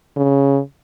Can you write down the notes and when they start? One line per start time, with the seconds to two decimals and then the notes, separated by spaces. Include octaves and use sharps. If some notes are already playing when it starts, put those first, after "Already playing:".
0.17 C#3